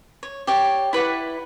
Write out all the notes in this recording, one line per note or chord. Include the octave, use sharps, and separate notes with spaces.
C#5
G4 C#5 D5
E4 B4 D5 F#5